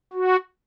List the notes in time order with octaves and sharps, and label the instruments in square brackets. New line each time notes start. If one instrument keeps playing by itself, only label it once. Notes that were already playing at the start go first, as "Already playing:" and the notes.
[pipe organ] F#4